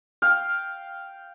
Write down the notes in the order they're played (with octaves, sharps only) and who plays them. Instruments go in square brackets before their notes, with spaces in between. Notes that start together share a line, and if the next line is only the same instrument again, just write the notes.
[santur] F5 G5